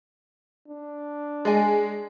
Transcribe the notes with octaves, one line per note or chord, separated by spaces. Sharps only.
D4
G#3 D5 D#5 G#5